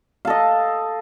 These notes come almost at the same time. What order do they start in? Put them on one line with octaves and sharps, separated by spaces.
F5 A4 D#5